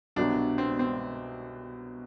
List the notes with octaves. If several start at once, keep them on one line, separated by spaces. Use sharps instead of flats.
C2 B2 F#3 D4
C4
C4